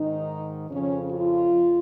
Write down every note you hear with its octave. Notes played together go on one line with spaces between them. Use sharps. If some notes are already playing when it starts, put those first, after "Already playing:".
Already playing: G#2 D#3 D#4
F2 C#3 F3 C#4
F4
F2